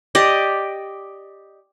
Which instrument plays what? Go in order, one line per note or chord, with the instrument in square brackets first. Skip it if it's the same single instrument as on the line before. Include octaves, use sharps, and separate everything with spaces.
[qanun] G4 D5 D#5